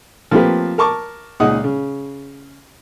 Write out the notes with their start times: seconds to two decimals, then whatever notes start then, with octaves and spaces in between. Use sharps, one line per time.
0.31 F3 A3 A#3 C4 G4 B4
0.78 A#4 A5 C#6 D6
1.40 C#2 A#2 D#4 G#4 F#5 D#6
1.64 C#3